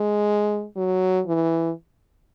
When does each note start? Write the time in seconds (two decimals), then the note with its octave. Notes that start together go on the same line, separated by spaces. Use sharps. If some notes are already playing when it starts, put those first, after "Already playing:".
Already playing: G#3
0.76 F#3
1.26 E3